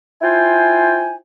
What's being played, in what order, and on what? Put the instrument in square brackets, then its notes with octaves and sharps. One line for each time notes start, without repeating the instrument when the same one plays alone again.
[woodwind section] E4 F4 C5 G5 G#5